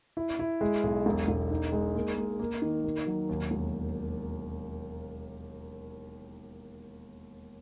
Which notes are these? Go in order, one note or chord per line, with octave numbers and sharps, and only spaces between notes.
E4
E4
G#3
B1
E1
E1
D#4
G#3
A#3
A#3
A#3
D#3
A#3
F#3
D#2
E1